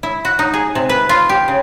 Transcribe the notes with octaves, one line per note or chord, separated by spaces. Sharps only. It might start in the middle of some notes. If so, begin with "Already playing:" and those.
E4
F#4
D#4
G#4
C3
B4
F4
G4
C#3